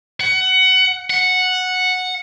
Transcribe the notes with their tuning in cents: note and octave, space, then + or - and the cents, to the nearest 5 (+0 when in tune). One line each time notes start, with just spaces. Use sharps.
F#5 +20
F#5 -5